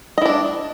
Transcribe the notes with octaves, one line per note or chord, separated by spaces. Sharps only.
D4 E4 D#5